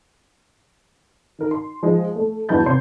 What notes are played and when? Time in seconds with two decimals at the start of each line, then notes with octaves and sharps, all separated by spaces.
1.39 D#3 A#4
1.51 C6
1.83 F3 G#3
2.16 A3
2.49 E2 G2 F#3 B4 G6 A6
2.65 C3 C#5 C6